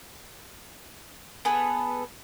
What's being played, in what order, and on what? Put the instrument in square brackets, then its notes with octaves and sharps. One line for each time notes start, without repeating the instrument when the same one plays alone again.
[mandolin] B3 G#4 A4 B4